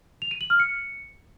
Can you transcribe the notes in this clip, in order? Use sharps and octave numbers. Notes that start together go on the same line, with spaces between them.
F7
D#7
F#7
F6
C#7